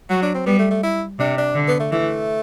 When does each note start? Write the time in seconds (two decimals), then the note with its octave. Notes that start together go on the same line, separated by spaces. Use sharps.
0.10 F#3 F#4
0.22 D4
0.34 C4
0.46 G3 B3
0.59 A3
0.71 A3
0.83 E4
1.19 C3 D4
1.38 D4
1.55 D3
1.68 B3
1.80 A3
1.92 E3 A3